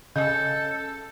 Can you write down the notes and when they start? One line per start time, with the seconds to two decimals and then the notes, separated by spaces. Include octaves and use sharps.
0.16 C#3 A4 D#5 G6